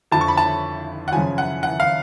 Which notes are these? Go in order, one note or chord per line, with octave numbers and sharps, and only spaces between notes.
F2 D3 F3 A5
C#6
B5
A5
F#5
F#2 C#3 F3 G#5
F#5
F#5
F5